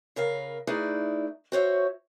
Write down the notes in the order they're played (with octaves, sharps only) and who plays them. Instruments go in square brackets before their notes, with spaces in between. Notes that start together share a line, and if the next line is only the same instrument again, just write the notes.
[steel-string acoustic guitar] C#3 A#4 B4 F5
A3 D#4 E4 G#4 B4 D5
F#4 C5 C#5 E5